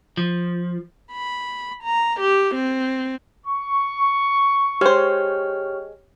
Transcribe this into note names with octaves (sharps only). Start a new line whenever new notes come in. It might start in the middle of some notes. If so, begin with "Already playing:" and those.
F3
B5
A#5
G4
C4
C#6
G#3 G4 C5 C#5 F6